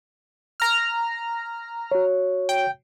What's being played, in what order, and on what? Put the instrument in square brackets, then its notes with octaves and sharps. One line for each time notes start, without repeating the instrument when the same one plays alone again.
[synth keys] A#5 F6
[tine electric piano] F#4 C#5
[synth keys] G5